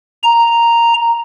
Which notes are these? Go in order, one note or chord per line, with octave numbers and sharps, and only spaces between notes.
A#5